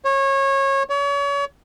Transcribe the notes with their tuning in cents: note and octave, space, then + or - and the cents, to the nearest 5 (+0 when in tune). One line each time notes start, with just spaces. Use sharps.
C#5 -25
C#5 +35